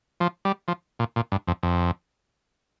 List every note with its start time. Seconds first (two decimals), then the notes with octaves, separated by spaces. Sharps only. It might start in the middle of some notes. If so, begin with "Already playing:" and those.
0.20 F3
0.45 G3
0.68 F3
0.99 A#2
1.16 A#2
1.32 G2
1.48 F2
1.63 F2